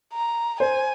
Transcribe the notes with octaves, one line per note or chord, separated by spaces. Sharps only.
A#5
C5 G#5